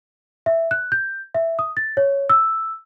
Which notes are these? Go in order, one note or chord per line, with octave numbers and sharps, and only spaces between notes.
E5
F#6
G6
E5
D#6
A6
C#5
E6